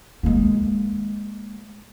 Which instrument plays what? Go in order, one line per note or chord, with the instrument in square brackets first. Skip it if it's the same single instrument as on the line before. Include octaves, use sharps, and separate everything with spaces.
[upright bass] G#3 A#3